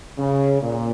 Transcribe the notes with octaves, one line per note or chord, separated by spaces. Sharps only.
C#3
A#2